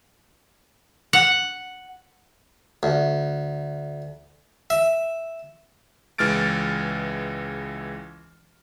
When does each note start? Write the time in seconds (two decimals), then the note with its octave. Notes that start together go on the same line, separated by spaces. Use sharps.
1.13 F#5
2.83 D2
4.70 E5
6.18 C#2 E3 G#3 F6 A6 D7